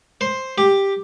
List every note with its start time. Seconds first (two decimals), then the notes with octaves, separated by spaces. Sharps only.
0.21 C5
0.58 G4